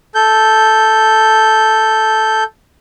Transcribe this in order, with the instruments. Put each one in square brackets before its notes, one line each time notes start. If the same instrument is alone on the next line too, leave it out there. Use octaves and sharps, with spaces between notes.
[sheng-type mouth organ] A4 G6